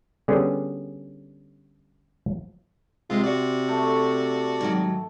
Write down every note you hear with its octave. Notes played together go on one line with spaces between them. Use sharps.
D3 G3 B3 C#4 G#4
C3 G#3 F4
F#4 D5
A3
G#2 D#3 F#3